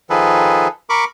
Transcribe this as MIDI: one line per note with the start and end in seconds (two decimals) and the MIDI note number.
0.10 0.68 51
0.10 0.68 53
0.10 0.68 68
0.10 0.68 69
0.10 0.68 71
0.90 1.05 70
0.90 1.05 83
0.90 1.05 85
0.90 1.05 86